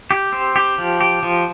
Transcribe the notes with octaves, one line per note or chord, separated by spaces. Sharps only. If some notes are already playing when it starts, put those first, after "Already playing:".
G4
C4
G4
F3
G4
F3